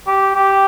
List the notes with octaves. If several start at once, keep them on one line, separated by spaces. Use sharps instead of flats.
G4
G4